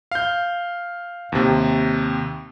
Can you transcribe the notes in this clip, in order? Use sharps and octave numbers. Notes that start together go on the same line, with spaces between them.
F5 G6
D#2 C3